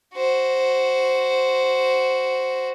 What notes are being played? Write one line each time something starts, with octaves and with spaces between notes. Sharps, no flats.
F#4 C5